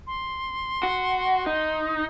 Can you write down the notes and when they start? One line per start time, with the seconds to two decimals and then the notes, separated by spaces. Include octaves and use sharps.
0.07 C6
0.83 F#4
1.46 D#4